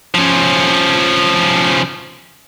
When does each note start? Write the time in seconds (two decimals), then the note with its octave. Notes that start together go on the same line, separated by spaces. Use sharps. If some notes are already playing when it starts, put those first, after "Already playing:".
0.14 F3 C#4